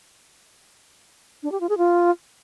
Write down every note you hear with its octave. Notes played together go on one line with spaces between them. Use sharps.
D4
G4
F4
G#4
F4